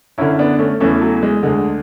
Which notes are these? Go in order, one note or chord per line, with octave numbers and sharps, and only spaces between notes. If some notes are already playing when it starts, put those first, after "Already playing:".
F#2 D3 C#4 E4
B3 D4
A3 C#4
E2 C#3 E3 A3 C#4
F#3 A3
G#3
D2 D3 G#3